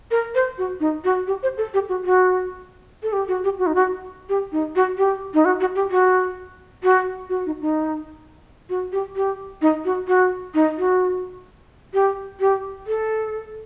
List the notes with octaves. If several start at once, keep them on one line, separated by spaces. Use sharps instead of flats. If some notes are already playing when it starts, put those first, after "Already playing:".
A#4
C5
F#4
D#4
F#4
G4
C5
A4
G4
F#4
F#4
A4
G4
F#4
G4
F#4
D#4
F#4
G4
D#4
F#4
G4
D#4
F#4
F#4
G4
F#4
F#4
F#4
D#4
D#4
F#4
G4
G4
D#4
F#4
F#4
D#4
F#4
G4
G4
A4